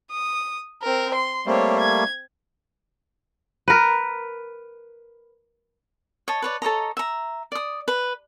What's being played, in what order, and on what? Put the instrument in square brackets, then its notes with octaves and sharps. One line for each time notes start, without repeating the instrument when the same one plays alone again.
[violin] D#6
C4 A#4
C6
[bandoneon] G3 A3 A#3 [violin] C4 C#5
[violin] G#6
[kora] A#4 B4
[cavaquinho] C#5 D#5 A5
B4 C#5 D5
A4 C#5 D#5 A#5
E5 A#5
D5 D#6
B4